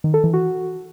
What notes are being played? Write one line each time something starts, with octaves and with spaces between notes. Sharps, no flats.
D#3
A4
E3
F#4